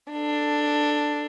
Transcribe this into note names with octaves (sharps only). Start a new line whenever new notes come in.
D4 A4